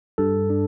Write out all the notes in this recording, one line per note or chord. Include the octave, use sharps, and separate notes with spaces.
G2 A4
D4